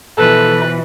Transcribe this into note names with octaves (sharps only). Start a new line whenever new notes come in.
B2 E3 F3 A4 B4